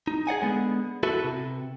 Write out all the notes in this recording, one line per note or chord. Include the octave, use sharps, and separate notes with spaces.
D#4
G#4 D5 F#5 G#5
D3 G#3 B3
E4 F#4 A4 B4
C3